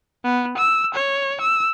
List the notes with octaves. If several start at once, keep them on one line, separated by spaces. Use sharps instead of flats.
B3
E6
C#5
E6